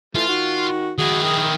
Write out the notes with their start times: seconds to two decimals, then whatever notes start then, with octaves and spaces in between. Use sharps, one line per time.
0.15 E3 A3 F4
0.28 D#3 F#4
0.98 D#3 E4 F#4 G#4
1.23 G5 D#6 F6